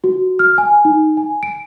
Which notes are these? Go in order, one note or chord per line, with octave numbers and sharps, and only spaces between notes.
F#4
F6
G#5
D#4
G#5
D7